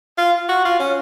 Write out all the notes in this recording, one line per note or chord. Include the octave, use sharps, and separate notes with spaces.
F4
F#4
F4
C#4